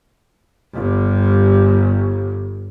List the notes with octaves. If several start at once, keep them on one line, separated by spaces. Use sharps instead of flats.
G1 G2